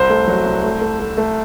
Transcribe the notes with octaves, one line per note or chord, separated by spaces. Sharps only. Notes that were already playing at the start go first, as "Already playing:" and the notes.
Already playing: C2 C5
A3
F#3
C2
A3
A3
A3
A3